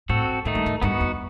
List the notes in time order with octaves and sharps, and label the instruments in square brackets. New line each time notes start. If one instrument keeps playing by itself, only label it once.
[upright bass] A2 [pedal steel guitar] C4 F#4 A4
[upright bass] A2 [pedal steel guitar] D#3 A3 D#4
[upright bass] G2
A2
[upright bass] G2 [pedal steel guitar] B3 D#4 F#4
[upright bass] E2